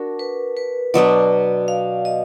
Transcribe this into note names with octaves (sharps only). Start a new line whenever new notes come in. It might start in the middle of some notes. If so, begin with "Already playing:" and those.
Already playing: D4 F#4 A#4
B4
B4
B2 F#3 B3 D4 D5
F5
D#5